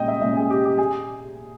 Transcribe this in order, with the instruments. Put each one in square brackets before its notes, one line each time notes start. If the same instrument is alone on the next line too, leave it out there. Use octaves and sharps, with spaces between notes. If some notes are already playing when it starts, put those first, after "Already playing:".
Already playing: [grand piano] A#2 G#3 C#4 D#5 G5
E5
A#2 G#3 C#4 E5
G#4
G4
G4
G#4